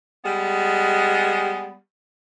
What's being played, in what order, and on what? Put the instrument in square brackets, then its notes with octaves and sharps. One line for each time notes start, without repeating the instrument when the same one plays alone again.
[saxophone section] G3 G#3 B3